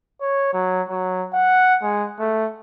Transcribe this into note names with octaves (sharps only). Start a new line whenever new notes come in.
C#5
F#3
F#3
F#5
G#3
A3